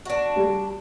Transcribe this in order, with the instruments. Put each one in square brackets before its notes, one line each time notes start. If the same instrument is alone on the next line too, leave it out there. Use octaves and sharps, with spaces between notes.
[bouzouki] D4 F#4
[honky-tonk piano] G3